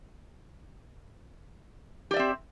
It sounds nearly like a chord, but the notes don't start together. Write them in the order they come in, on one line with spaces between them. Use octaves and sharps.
G4 D5 E5 C4